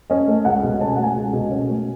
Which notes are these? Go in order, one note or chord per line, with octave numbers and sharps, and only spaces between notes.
C#4 D#5
A3
C#2 F#5
B2
C#4 A5
G#5
A3 F#5
G#5
C#2
B2
C#4
A3